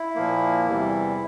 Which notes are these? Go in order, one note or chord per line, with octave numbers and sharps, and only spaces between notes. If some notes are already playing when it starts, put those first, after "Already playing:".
Already playing: E4
A#2 F3 A#3
E2 C3 E3 G3